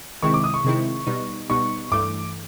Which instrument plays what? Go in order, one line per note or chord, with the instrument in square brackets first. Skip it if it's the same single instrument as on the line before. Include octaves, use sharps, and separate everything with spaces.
[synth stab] C3 D#3 G#3 C4 E4 [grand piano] C#6
[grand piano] D6
D#6
C#6
[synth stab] C3 D#3 G#3 C4 E4
B2 G3 B3 D#4
[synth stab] B2 G3 B3 D#4 [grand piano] C#6
[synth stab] G2 E3 A3 [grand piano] D6